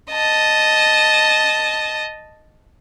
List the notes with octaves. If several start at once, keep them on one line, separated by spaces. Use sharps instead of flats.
D#5 A5